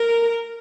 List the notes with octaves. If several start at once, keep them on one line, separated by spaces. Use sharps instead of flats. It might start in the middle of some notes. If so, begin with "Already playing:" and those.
Already playing: A#4